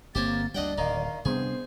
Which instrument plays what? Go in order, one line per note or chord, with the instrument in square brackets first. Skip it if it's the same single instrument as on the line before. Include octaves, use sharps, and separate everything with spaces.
[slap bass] G1 C4 [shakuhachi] A#3 [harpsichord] G4 C5 C#5 [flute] A6
[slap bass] D2 G3 [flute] D4 [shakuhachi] D5 [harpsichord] D#5 F#5 G5
[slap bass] D1 [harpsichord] D#3 D#4 [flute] F5
[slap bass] C3 G3 D4 [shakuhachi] B3 [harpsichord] G#4 [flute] C5